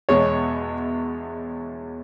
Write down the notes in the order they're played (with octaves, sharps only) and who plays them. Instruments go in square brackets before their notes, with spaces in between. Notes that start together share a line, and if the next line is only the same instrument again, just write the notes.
[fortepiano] E2 B2 G#3 C#5